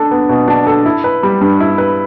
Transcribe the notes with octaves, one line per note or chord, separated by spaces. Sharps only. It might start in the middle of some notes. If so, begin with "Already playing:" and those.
Already playing: D4 A4
B3
B2
D4
A4
E4
B4
G3
G2
E4
B4